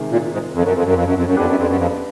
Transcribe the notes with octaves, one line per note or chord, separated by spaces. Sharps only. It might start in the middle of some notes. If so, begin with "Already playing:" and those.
Already playing: C3 D#3 G#3
A#2
G#2
F2
F#2
F2
F#2
F2
F#2
F2
F#2
F2 B3 D4 G4 B4 D5
F#2
F2
F#2
F2